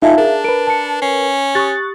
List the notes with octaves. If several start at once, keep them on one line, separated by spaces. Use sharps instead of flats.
A2 D#4 F4 E5 F5 G#5 A5
D4 G#4 A#4
A#4 B4 D7
A5 C#7
C#4 C7
G4 C#6 D#6 F#6 A6